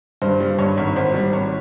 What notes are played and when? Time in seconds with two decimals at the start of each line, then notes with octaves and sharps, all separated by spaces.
0.22 G2 C5
0.40 G3
0.59 G2 C#5
0.77 G#1
0.96 G#1 C5
1.14 G3
1.33 G#1 C#5